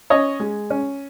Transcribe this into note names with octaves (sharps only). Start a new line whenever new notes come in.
C#4 C#5 D#5
G#3
C#4